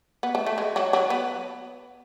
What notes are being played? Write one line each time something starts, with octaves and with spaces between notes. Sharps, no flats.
B3
A3
A3
G#3
F#3
F#3
B3